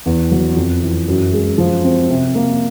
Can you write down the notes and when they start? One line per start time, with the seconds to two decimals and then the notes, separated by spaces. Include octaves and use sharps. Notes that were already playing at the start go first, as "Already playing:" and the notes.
0.06 E2
0.31 F#3
0.57 F2
0.82 E3
1.08 F#2
1.33 G#3
1.58 F3
1.84 C4
2.10 C3
2.35 A#3